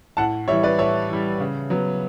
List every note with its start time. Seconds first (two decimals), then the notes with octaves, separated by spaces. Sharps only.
0.17 A2 F#5 A5
0.48 G3 C#5 E5
0.51 E3
0.63 B4 D5
0.78 A2 C#5 E5
1.09 E3 G3
1.40 C#3
1.70 F#3 B3